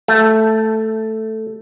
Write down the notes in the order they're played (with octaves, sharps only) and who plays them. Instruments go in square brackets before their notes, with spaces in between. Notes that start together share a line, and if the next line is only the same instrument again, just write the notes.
[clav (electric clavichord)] A3